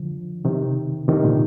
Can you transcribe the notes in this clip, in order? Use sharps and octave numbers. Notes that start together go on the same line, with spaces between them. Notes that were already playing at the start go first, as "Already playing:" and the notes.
Already playing: D3 F3
C3 D#3
C3 D#3
A#2 D3